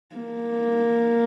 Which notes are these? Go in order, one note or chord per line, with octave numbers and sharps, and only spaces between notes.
A#3